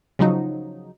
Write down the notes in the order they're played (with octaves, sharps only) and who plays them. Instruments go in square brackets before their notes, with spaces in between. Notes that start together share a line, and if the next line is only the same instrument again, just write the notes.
[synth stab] C#3 F3 F#3 D#4